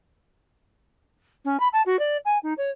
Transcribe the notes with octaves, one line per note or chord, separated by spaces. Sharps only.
C#4
B5
A5
F#4
D5
G#5
D#4
C#5